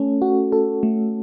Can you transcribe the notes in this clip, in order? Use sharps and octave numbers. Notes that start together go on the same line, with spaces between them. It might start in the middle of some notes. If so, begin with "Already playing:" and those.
Already playing: A3 C#4 A4
F#4
A4
A3